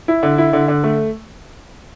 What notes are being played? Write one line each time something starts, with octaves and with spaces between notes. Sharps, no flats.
E4
D3
E4
D3
D3
A3